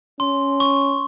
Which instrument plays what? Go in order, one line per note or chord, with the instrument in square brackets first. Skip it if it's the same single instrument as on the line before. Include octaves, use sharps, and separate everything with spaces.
[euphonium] C#4 [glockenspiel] C6
[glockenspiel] C#6